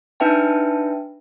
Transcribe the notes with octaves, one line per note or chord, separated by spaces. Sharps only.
D4 D#4 B4 E5 G5 A5